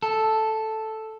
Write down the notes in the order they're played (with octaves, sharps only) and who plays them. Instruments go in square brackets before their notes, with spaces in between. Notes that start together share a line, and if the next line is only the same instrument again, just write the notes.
[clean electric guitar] A4